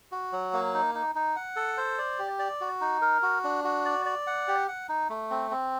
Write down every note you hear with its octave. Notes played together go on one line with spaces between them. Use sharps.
F#4
F#3
A#3
D#4
D#4
D#4
F#5
A4
C5
D5
G4
D5
F#4
D#4
A#4
F#4
D4
F#4
D5
D5
F#5
G4
F#5
D#4
A3
C4
C4